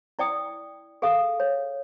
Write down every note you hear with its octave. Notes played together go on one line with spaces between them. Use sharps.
E4 D5 G5 D#6
G#4 A4 F5 D#6
C#5